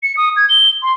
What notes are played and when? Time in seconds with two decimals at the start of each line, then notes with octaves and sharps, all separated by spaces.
0.03 C#7
0.17 D#6
0.37 G#6
0.49 G7
0.83 C6